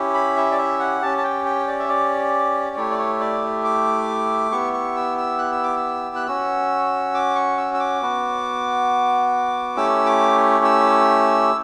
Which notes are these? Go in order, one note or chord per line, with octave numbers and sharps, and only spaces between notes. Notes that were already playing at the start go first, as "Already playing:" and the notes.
Already playing: C#4 E4 G4
B5
E5
D5
E5
F#5
C#4 G4 A5
A5
G5
G5
D5
E5
D5
A3 E4 G4 C#5
D5
C#5
D5
D6
B3 E4 G4 C#6
C#6
E6
E6
F#6
E6
D6
E6
F#6
C#4 F#4 E6
D6
C#6
E6
E6
D6
B3 F#4
A3 C#4 E4 G4 E6
D6
E6